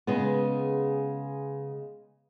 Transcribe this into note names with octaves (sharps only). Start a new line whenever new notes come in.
C#3 G#3 B3